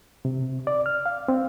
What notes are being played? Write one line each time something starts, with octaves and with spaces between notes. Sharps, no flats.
C3
D5
F6
F5
C4